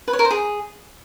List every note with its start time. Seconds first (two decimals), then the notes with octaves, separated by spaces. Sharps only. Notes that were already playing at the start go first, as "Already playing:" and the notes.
0.08 B4
0.13 C#5
0.19 A#4
0.25 C5
0.31 G#4